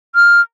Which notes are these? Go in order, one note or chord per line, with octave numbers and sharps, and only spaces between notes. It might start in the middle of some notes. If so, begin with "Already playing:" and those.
F6